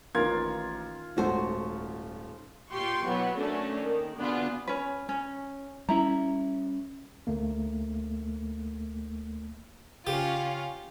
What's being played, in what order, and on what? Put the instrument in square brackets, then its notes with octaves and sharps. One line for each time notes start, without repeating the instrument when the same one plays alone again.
[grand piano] A1 A#4 G#6 [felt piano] D#3 A#3 [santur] F4
[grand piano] D#1 A3 [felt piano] G#2 [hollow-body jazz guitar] F#4 C5
[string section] A#2 F4 G4 C6 C#6
B2 E3 F#3 B3
F#3 A3 A#3 C#4 D4
D#3
B2 D3 B3 D4 F4 G#4
[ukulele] C#4 B4
C#4
[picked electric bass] G3 C#4 [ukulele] E4 A#5
[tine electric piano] D2 A3 A#3
[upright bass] C#3 [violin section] C#4 F4 [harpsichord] G4 [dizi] F5